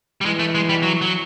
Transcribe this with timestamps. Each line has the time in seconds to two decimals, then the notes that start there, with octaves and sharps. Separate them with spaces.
0.21 G3
0.25 E3 G#3
0.39 A3
0.55 G#3
0.69 G3
0.83 F#3
1.02 F#3